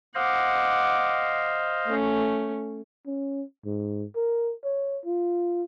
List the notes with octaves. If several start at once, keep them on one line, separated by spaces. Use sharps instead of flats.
C5 D#5 F5 F#5 D6
A3 C#4
C#4
G#2
A#4
C#5
F4